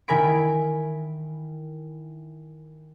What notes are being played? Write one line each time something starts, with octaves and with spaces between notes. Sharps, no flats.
D#3 E4 A#4 G#5 B5 D7